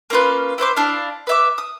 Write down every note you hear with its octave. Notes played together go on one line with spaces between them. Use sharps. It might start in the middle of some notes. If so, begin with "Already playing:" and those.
A#3 C#4 F4 B4
E4 B4 C5 D6
D4 E4 F5
B4 E5 D6
D#6